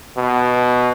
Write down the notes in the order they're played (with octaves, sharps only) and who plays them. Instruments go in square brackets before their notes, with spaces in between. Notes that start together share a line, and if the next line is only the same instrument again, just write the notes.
[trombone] B2